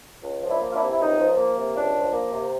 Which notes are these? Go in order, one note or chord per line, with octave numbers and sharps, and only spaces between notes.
C#2
F3
D4 E4
A#3
F4
D4 E4
C3
E4
C#2 D#4
F3
A#3
C3
C#2 D4
F3
A#3
C3